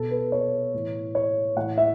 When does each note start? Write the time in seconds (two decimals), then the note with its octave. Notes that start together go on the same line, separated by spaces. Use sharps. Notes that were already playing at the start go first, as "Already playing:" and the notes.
Already playing: B2 A4
0.11 B4
0.32 C#5
0.74 A2 E3
1.15 C#5
1.56 A2 E3 F#5
1.78 E5